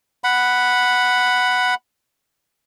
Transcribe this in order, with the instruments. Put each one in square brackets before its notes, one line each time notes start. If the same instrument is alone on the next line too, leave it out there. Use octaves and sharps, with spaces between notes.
[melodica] F#5 B5